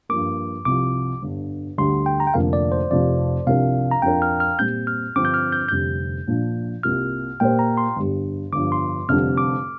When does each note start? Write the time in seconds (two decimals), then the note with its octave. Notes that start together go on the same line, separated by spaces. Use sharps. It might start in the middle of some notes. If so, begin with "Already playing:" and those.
0.09 G2 F3 A#3 D6
0.65 C2 C3 F3 D6
1.22 G1 G2 D3
1.78 D2 D3 G3 C6
2.06 G5
2.20 A#5
2.27 G5
2.34 F1 F2 D3 F3 A#3 F5
2.53 D5
2.72 C5
2.90 F1 F2 C3 F3 D5
3.46 C2 C3 F3 D4 A#4 F5
3.91 A#5
4.02 F2 F3 D4 F4 A#4 G5
4.22 F6
4.40 F6
4.59 A#2 G3 C4 G6
4.87 F6
5.16 G2 D3 F3 C4 D6
5.25 G6
5.34 F6
5.52 G6
5.69 F1 F2 D3 G3 C4 G6
6.27 A#1 A#2 F3 D4
6.83 C2 C3 A#3 F4 F6
7.40 A#2 A#3 G4 C5 G5
7.59 A#5
7.77 C6
7.96 G1 G2 G3
8.52 G1 D6
8.55 G2 F3
8.72 C6
9.08 F1 F2 D3 G3 C4 F6
9.38 D6